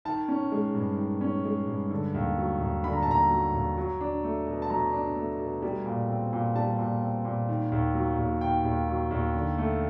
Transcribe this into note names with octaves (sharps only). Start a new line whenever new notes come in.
D#3 A5
C#4
G#3
G2
D#3
C#4
G#3
G2
D3
D#2
F#3
D#2
D3 B5
A#5
A5
D#2 A#5
F#3
D#2
F#3
D4
A3
B2
A5
F#3 A#5
D4
A3
B2
G3
A#2
C4
A#2
G3 A5
A#2
C4
A#2
D#3
D#2
F#3
D#2
D#3 G5
D#2
F#3
D#2
D3
A3